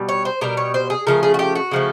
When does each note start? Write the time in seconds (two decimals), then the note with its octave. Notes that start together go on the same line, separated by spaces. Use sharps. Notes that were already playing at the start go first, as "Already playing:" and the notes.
Already playing: B2 G3
0.09 C#5
0.25 C5
0.41 B2 G3 A#4
0.57 C#5
0.74 C5
0.90 G#4
1.07 C#3 F3 A3 A#4
1.23 G#4
1.34 F#4
1.39 G4
1.55 F#4
1.71 C#3 F3 A3